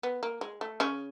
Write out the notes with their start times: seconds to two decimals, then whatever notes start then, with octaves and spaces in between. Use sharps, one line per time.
0.03 B3
0.23 A#3
0.41 G#3
0.61 A3
0.80 C#3 C#4